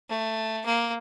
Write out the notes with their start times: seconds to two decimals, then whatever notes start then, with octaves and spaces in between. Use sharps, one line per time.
0.09 A3
0.66 A#3